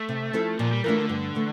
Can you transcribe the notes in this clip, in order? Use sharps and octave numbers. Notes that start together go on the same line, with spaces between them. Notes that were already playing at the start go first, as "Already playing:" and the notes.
Already playing: A3
C3
F3 C4 E4 A4
A#2 F3
G3
E3 A3 D4 F4 A#4
D3
G2
E3 A3